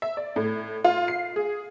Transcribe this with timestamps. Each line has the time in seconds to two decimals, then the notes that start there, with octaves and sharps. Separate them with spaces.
0.02 E5
0.17 D5
0.36 A2
0.85 F4
1.08 C7
1.36 G#4